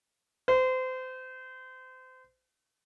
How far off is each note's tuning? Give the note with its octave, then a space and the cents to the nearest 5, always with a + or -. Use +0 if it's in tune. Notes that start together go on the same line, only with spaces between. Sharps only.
C5 -30